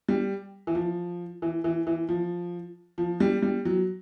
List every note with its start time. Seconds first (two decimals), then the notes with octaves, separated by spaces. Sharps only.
0.08 G3
0.67 E3
0.75 F3
1.42 E3
1.64 E3
1.87 E3
2.09 F3
2.98 F3
3.20 G3
3.42 G3
3.65 F#3